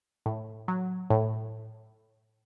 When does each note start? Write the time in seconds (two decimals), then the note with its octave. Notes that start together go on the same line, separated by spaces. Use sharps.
0.26 A2
0.68 F#3
1.10 A2